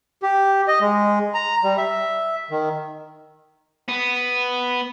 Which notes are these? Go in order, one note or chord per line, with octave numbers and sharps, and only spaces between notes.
G4
D#5
G#3
A#5
G3
E5
D#3
B3